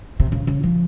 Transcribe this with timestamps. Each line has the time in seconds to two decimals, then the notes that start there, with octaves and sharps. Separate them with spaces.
0.20 C3
0.32 C#3
0.47 C#3
0.64 F3